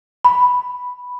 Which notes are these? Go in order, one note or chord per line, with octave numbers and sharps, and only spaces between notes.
B5